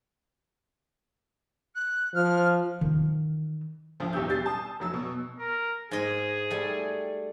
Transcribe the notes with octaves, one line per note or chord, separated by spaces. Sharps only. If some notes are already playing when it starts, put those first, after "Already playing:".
F#6
F3 F6
D#3 E3
D2 F3
B1 E2 B2 G3 E6 G6
G3 E6 G6 A6 C7
A5 D#6
F1 F#3 E6
B2
A#4
G#2 G#4 D#5
G3 A3